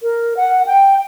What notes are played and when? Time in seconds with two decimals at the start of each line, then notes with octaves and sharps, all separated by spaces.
0.03 A#4
0.37 F#5
0.66 G5